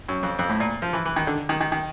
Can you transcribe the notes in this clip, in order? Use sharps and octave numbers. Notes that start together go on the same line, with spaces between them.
F#2
F2
F2
A2
A#2
F3
E3
E3
D#3
D3
D#3
D#3
D#3